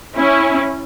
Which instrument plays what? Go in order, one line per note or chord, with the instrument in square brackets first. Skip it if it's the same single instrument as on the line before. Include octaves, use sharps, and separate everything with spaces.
[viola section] C#4 E4